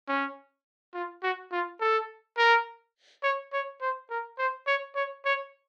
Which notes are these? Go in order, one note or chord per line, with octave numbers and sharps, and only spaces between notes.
C#4
F4
F#4
F4
A4
A#4
C#5
C#5
C5
A#4
C5
C#5
C#5
C#5